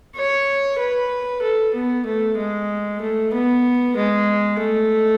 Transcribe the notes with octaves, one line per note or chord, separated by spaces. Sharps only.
C#5
B4
A4
B3
A3
G#3
A3
B3
G#3
A3